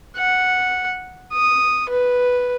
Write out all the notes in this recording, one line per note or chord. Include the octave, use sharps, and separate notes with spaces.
F#5
D#6
B4